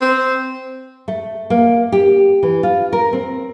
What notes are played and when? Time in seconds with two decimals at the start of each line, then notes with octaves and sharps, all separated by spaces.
0.02 C4
1.08 A3
1.50 A#3
1.92 G4
2.43 E3
2.63 F4
2.93 A#4
3.13 C4